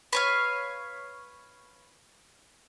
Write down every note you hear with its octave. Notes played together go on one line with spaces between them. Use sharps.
B4 C#5 F5